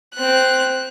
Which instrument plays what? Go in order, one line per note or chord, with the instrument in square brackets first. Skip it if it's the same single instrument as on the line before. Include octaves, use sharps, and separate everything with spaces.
[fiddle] C4 F#6